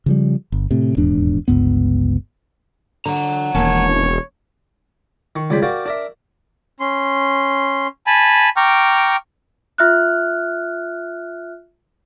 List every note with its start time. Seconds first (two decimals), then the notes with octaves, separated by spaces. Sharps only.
0.06 C#3 F3 G3
0.52 G1
0.71 A2 C3
0.97 D#1 E2 G#2 D4
1.48 G1 C#2 G2 B3
3.06 D3 F#5 A#5
3.55 E1 D#2 C#4 C#5 A5
5.36 D#3 C#6
5.50 C#2 C#3 G3 G5 B5 C6
5.62 F#4 G4 A#4 D5 F5 G5
5.86 D4 A#4 E5
6.80 C#4 C6
8.06 G#5 A5 B5
8.57 G5 A#5 C#6 D6 F6
9.78 F4 E5 F6 F#6